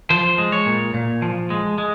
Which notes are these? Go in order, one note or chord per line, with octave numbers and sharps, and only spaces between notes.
F3 C5
G#3
C#5
A#2
A#2
F3
G#3
G#3